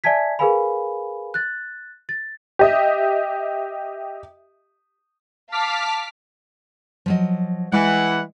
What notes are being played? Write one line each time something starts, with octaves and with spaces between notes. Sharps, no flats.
D5 E5 G#5 A5 G#6 B6
G#4 A#4 B4 F5 G#5 B5
F#6 A6
A6
G4 D#5 E5
F5 A5 D6 F6 B6
F3 F#3 D#5
E3 G#3 F#5